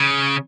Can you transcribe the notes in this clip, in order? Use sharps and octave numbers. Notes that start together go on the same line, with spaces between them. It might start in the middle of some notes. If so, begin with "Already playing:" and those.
Already playing: C#3